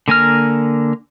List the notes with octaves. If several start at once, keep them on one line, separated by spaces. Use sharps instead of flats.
D3 A#3 G#5 A#5 F6